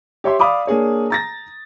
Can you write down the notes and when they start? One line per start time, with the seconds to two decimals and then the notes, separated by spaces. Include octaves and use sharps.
0.24 G4 C#5 E5 C6
0.39 D5 F5 B5 D6 D#6
0.67 A#3 D4 G#4 C#5
1.10 A#5 A6 A#6